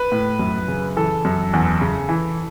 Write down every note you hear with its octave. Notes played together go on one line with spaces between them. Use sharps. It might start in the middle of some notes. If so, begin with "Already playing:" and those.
Already playing: B4
A2
F#2
C#3
E3 A4
F#2
E2
C#3
E3